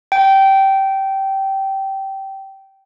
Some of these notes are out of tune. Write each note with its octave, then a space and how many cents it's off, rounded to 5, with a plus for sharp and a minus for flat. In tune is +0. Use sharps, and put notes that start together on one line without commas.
G5 -15